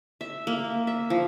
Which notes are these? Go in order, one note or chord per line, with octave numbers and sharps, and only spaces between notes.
E5
A#3
E5
F3